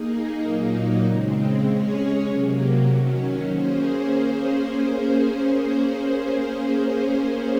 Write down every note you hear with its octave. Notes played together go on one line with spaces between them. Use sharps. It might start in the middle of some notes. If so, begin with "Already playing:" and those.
Already playing: A#3 D#4 G#4
A#2 F#3 A#3 D#4
C#3 G#3 C4
G#3 C#4 G#4 C#5
C3 F#3 A#3
D#3 F#3 C#4
A#3 C#4 G#4 C5